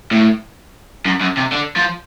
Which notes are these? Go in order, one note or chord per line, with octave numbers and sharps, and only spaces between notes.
A2
F#2
F#2
C3
D3
F3